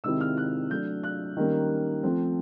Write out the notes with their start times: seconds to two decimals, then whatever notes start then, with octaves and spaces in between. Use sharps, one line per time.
0.04 C3 D#3 G#3 C4 E4 E6
0.21 F6
0.37 F#6
0.71 F#3 A3 D4 G6
1.04 F#6
1.37 D#3 G3 A#3 C#4
2.03 F3 A3 C4